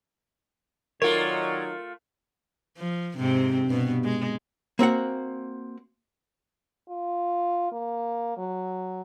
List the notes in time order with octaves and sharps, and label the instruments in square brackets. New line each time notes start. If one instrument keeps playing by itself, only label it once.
[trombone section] D#3 F#3 D#4 [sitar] A3 F4 [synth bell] A#4 [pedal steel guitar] C#5 D5
[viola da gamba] F3
G#2 C3 C4
G2 B2 B3
G#3
[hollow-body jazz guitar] A#3 C4 F#4 F#5
[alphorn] F4
A#3
F#3